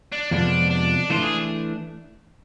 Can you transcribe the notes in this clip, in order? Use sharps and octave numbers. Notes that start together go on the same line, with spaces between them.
D4
F2 C3 F3 G#3 B3 D4
D4
E3 A3 D4 F4
G#4